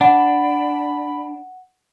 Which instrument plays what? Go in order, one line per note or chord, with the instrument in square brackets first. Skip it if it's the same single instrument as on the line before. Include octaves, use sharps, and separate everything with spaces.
[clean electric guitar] D4 [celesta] F#5 [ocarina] B5